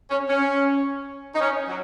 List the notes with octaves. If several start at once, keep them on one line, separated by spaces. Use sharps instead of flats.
C#4
C#4
D#4
C#4
F#3